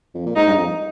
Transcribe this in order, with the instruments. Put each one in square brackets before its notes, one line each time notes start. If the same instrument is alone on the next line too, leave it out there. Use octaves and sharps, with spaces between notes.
[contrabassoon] F2
A#2
[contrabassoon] G#2 [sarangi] D#4
[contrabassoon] G2
F2